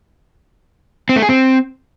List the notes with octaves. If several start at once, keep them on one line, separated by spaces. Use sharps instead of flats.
C4
A3
G#4
C4